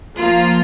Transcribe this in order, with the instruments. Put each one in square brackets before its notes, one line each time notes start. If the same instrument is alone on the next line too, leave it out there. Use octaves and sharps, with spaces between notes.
[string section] F3 A#3 F4